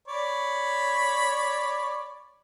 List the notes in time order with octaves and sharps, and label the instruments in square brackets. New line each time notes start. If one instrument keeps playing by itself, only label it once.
[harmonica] C#5 D5 B5